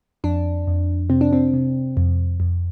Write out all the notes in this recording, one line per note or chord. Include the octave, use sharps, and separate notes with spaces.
F2 D4
F2
C3 C4
D4
C4
C3
F2
F2